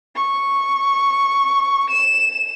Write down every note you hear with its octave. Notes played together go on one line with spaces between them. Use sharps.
C#6
E7